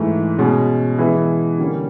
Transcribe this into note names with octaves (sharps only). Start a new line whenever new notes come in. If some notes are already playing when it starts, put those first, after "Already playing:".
Already playing: G#2 E3 A3
B2 G#3 C#4
E3 G#3 B3 E4
D3 G3 A#3 C#4